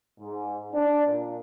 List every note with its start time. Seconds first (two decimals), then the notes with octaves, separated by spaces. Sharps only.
0.20 G#2
0.73 D4
1.07 A#2